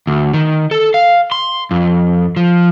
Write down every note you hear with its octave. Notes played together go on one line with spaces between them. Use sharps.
D2
D#3
A4
F5
C6
F2
F3